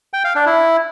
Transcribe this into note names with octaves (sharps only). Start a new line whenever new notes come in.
G5
F5
D4
E4